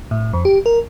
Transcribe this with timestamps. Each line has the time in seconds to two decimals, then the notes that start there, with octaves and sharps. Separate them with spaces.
0.11 A2
0.33 F2
0.45 G4
0.66 A#4